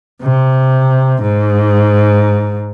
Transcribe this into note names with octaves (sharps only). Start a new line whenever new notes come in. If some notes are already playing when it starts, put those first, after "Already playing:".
C3
G#2